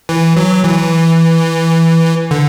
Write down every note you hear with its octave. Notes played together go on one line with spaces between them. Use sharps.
E3
F#3
E3
D3